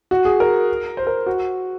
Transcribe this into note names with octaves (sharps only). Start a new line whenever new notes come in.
F#4
G#4
A#4
C5
A#4
F#4